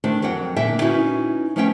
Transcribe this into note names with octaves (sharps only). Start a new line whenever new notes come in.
D#3 A3 D4 C5
F2 F#3 A#4 F#5 G5
A#2 D3 A#4 E5 G5
B3 C#4 D#4 E4 F#4
F3 A3 B3 C#4 C#5 G5